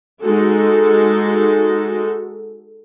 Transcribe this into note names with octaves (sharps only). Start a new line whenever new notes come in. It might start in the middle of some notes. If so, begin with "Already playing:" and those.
G#3 D#4 F#4 A4